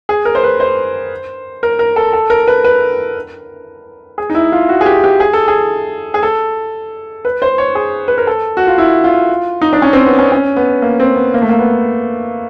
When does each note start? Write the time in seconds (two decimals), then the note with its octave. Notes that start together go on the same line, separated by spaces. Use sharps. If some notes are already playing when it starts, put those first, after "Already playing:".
0.09 G#4
0.25 A#4
0.35 C5
0.44 B4
0.60 C5
1.63 A#4
1.79 A#4
1.96 A4
2.13 A4
2.30 A#4
2.47 B4
2.64 B4
4.18 G#4
4.30 D#4
4.35 E4
4.52 F4
4.69 F#4
4.81 G#4
4.86 G4
5.04 G4
5.20 G#4
5.33 A4
5.48 G#4
6.14 G#4
6.23 A4
7.25 B4
7.42 C5
7.58 C#5
7.75 G#4
8.08 B4
8.18 A#4
8.27 A4
8.57 F#4
8.67 F4
8.78 E4
9.04 F4
9.61 D#4
9.73 D4
9.82 C#4
9.93 C4
10.06 B3
10.19 C#4
10.32 C#4
10.56 B3
10.82 A#3
11.00 C4
11.16 B3
11.34 A#3
11.42 A3
11.49 A#3
11.59 B3